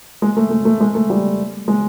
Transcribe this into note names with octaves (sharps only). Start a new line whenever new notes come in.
G#3
A3
A3
A3
G#3
A3
G3
G#3